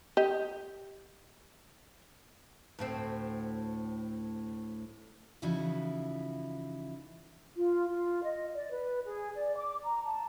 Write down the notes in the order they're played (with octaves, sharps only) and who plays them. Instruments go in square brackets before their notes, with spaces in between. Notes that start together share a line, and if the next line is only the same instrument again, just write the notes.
[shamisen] G4 D#5
[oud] D2 A2 C4
[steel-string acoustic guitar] C#3 E3 F3 D#4 E4 F#4
[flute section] F4
F4
D#5
D5
B4
G#4
D5
D6
A#5
A5